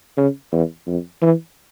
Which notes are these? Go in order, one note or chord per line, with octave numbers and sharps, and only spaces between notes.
C#3
E2
F2
E3